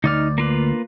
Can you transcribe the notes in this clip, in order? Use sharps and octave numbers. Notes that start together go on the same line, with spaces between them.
D2 D#4 D5 F6
A#3 F4 B4